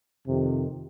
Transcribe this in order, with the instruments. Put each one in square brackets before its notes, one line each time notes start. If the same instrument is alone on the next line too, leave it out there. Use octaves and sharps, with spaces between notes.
[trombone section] F2 C3 D#3